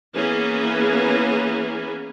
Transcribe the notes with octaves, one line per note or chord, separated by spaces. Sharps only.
E3 A#3 B3 C#4 G#4